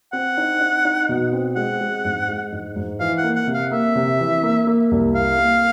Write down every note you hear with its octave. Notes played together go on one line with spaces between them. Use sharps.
C4 F#5
D#4
D#4
D#4
B2
C4
G#3 F#5
G#3
G#2
G#3
G#2
G#2
E3 F5
F#5
A#3
F#5
C3
F5
A#3 E5
C3
E3
A#3
A#3
C2
A#3 F5
A#3